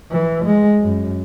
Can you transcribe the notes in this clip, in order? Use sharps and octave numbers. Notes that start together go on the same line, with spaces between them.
E3
G#3
F#2